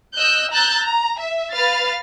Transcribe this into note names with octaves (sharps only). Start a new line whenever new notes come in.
D#5 E6 F#6 G6
A#5 E6 F#6 G6 A6
A#5
E5
B4 F5 F6 A6